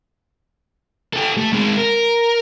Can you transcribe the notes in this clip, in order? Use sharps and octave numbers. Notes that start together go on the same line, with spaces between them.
G4 A4
A3
G#3 C4
A#4